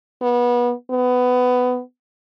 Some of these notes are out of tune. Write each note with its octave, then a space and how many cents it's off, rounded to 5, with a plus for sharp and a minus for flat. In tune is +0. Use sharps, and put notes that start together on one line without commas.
B3 -25
B3 +15